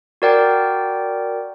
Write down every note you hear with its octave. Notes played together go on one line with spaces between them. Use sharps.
F#4 A#4 D5 G5